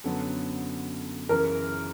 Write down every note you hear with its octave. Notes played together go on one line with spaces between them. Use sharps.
F#2 D3 F#3 B3 A4
F#2 C#3 E3 A#4